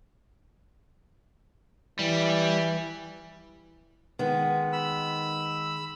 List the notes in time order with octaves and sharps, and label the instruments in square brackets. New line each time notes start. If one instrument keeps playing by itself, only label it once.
[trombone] E3 [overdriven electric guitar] G3
[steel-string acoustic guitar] D#3 G#3 [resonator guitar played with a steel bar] B3
[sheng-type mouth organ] B5 E6